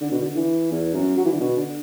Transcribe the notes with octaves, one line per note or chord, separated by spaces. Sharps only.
D3
B2
D3
E3
E2
F#2
F#3
E3
D3
B2
D3